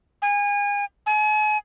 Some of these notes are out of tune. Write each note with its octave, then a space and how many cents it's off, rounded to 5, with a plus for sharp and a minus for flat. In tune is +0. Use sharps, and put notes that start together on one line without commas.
G#5 -30
G#5 +40